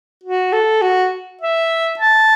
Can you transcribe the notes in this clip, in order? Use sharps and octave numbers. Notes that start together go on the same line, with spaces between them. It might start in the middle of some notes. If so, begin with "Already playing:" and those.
F#4
A4
F#4
E5
A5